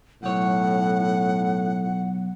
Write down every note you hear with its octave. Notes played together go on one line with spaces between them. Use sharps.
B1 A2 C#5 F#5